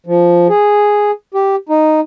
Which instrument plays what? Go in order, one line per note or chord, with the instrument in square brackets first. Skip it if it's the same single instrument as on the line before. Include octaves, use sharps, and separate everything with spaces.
[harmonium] F3
G#4
G4
D#4